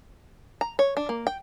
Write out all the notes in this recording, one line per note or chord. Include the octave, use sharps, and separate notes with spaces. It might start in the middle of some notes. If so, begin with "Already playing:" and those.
A#5
C#5
D4
A#3
G5